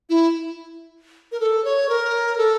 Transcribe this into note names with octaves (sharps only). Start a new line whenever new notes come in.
E4
A#4
A4
C#5
A#4
A4